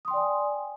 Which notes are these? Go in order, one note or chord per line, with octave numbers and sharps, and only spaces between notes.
D5 G5 G#5 C6 D#6